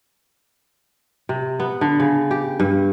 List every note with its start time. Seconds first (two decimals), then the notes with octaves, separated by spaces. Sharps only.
1.29 C3
1.60 B3
1.81 D3
2.00 C#3
2.31 G4
2.60 G2